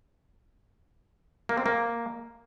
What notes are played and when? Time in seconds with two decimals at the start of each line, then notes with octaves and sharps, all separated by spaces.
1.49 A#3
1.57 C4
1.66 A#3